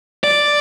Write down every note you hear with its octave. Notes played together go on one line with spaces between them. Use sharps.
D5